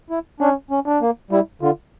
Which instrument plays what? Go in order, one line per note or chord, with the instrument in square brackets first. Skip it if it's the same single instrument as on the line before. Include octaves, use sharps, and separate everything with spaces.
[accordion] E4
[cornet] C#4 [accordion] D4
[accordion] C#4
[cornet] D4
[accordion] A#3
[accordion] G3 [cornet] E4
[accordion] D3 [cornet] F4